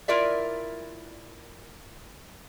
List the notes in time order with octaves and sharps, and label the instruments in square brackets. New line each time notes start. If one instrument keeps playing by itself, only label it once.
[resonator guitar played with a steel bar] E4 F4 A#4 D5 E5